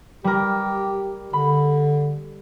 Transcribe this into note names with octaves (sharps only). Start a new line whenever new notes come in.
G3 G4 A#4
D3 B5